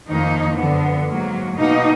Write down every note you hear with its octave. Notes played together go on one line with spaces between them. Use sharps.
F2 D#3 A#3 D#4
F#2 D3 F3 B3
G#2 F#3 A#3
B2 A#3 D#4